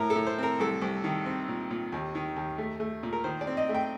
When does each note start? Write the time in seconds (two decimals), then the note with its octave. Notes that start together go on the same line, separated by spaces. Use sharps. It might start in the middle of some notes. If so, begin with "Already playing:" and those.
Already playing: A2 A#4
0.10 A4
0.16 A2
0.27 C5
0.39 C4 A#4
0.60 C2 A4
0.82 C2
1.04 D#3
1.26 C4
1.48 A#2
1.71 A#2
1.92 D#2
2.15 D#3
2.36 D#2
2.58 A3
2.80 A3
3.03 A#2
3.13 A#4
3.24 D#3 C5
3.41 D5
3.47 C4
3.57 D#5
3.69 A3
3.74 G5